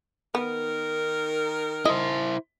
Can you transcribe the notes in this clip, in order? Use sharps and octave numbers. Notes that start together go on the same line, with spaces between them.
D#3 B3 D#4 A#4
E4 C5 D#5